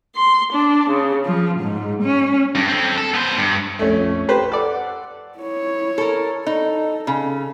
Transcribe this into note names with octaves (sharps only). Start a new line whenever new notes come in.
C6
D4
C#3
F3
G#2
C#4
G2
C4 A4
A4
B3 C5
G2
A#1 F2 A3 C#4 C#6
G4 B4 C5
A4 D5 F#5
E4 C#5
A4 A#4
D#4 A4
C#3 A4